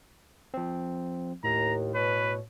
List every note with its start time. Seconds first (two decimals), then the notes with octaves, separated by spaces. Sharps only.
0.54 F3 C4
1.44 D#2 A2 A#5
1.94 B2 B4 C#5